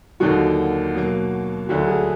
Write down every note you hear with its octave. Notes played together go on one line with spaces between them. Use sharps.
D#2 D3 F#3 A#3 D#4 F#4
B2 F#3 A#3
D2 D3 F#3 F#4
G#4